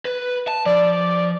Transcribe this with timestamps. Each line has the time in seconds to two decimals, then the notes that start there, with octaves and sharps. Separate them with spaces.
0.05 B4
0.48 A5
0.66 F3 D5